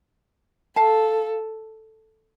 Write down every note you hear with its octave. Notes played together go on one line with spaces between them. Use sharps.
A4 F5 A5